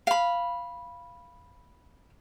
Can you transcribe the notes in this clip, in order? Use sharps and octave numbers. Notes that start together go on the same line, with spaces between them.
F5 B5